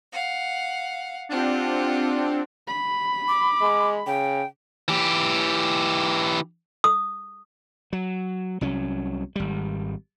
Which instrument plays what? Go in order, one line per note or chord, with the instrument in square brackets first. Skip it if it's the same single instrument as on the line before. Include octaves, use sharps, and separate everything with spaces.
[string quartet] F5 F#5
[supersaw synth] C4 D4 [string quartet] F4 G4 F#5
[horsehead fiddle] B5
[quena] D6
[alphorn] G#3
[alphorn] C#3 [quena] G5
[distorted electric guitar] E3 G4
[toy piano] D#6
[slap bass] F#3
C2 F#3 C#4
G#1 G3